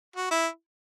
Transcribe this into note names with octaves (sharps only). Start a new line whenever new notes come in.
F#4
E4